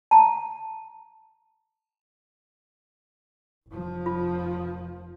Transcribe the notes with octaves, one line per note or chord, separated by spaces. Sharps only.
A5 A#5
F1 F3
F4